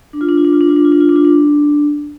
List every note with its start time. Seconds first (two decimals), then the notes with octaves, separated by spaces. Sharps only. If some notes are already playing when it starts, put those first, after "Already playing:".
0.13 D4
0.21 F4
0.29 D4
0.37 F4
0.45 D4
0.53 F4
0.61 D4
0.69 F4
0.76 D4
0.85 F4
0.92 D4
1.01 F4
1.09 D4
1.16 F4
1.25 D4